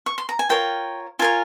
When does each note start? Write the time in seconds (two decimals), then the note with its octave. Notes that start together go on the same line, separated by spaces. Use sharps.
0.06 C#6
0.18 C6
0.29 A#5
0.39 G#5
0.49 F4 A#4 C#5 G5
1.19 F4 A#4 C#5 G#5